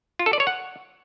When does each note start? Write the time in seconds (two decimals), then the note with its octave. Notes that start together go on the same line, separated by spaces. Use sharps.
0.19 F4
0.26 A4
0.33 D5
0.40 C#5
0.47 F#5